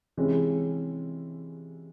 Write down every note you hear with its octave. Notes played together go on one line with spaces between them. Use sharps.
C3 E3 G#3 C#4